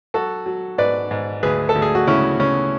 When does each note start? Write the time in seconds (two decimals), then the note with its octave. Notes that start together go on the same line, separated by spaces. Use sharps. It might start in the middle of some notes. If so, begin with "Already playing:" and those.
0.14 F#3 F#4 A4
0.46 F#3
0.78 G#2 B4 D5
1.11 G#2
1.43 D2 G#4 B4
1.69 A4
1.75 D2
1.82 G#4
1.95 F#4
2.07 C#3 C#4 E4
2.40 C#3 C#4